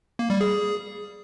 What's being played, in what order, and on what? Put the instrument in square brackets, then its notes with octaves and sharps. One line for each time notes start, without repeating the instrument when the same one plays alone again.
[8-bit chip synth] A#3
G3
G#4